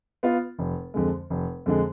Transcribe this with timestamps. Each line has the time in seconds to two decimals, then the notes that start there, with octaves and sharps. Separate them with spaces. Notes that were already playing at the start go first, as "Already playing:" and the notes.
0.23 B3 F4
0.59 F1
0.94 F2 D3 G#3
1.30 F1
1.66 F2 D3 G#3